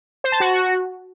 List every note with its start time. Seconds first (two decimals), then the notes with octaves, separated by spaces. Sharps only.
0.24 C5
0.32 A5
0.40 F#4